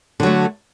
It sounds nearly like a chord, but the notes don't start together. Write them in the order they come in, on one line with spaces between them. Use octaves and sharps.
D3 F#3 A3